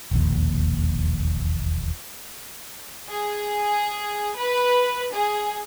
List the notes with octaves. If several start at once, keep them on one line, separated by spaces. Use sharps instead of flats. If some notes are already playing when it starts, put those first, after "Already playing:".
E1 A#1 D#2
G#4
B4
G#4